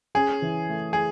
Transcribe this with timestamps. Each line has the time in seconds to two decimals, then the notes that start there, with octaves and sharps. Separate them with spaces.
0.15 C#4 G#4
0.42 E3
0.69 A3
0.93 G#4